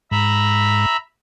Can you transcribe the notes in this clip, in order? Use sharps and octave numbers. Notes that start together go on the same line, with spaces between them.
G#2 E5 A#5 B5